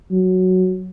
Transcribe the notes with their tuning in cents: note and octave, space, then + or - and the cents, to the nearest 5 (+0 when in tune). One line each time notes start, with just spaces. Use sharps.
F#3 +0